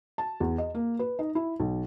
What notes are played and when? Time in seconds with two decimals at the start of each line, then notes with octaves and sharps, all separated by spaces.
0.18 A5
0.40 E2
0.58 D#5
0.75 A#3
0.99 B4
1.19 D#4
1.35 E4
1.60 B1